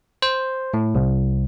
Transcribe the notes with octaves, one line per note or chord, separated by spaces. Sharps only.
C5
A2
C2